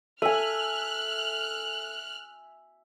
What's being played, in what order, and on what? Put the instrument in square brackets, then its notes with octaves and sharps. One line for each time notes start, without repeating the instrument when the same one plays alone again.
[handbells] A4 [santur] E5 G#5 [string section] F6 F#6